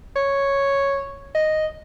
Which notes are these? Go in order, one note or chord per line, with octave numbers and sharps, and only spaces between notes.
C#5
D#5